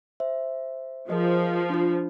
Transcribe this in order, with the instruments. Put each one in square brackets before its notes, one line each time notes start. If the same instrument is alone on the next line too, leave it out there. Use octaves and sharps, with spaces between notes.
[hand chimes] C5 E5
[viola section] F3 [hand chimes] G#4 A#4 D#5
[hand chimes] D4 F4